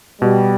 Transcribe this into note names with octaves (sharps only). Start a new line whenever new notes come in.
B2 G3